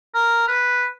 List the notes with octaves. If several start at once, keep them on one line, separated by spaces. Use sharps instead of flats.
A#4
B4